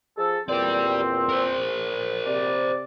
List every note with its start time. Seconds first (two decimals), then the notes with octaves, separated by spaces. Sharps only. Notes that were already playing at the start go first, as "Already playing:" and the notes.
0.18 F3 G#4 A4
0.49 E2 A#2 C4 G4 D5
1.29 A#4 C5
2.26 C3 D5